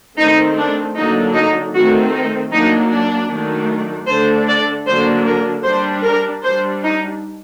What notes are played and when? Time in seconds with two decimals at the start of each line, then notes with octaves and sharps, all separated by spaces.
0.18 D#3 A3 C4 D#4
0.57 D4
0.96 D3 F#3 A#3 D4 D#4
1.35 D#4
1.74 D#3 A3 C4 F#4
2.13 D#4
2.52 F#3 A#3 D4 D#4
2.91 D4
3.30 D#3 F#3 A3 D4
4.08 D3 A3 D4 C5
4.48 D5
4.87 D3 F#3 A#3 D4 C5
5.26 A#4
5.64 G3 D4 C5
6.04 A#4
6.43 G3 D4 C5
6.83 D#4